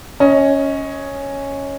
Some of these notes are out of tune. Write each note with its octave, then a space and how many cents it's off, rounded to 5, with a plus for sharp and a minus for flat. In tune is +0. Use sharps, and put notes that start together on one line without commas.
C#4 +0 D#5 +20